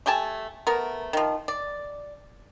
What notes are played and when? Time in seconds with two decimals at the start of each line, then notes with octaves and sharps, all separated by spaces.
0.06 A3 G4 G#5 A5
0.67 A3 B3 A#4
1.13 D#3 F3
1.48 D5